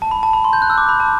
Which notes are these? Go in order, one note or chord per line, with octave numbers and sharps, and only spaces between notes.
A5
B5
A5
B5
C6
G6
F#6
E6
D6
B5
A5